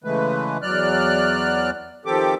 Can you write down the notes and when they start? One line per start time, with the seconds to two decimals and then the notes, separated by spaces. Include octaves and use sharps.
0.04 C#3 E3 G#3 A3 B4
0.62 E2 F#3 D5 F6 F#6
2.06 D#3 F3 C4 G4 A4 D6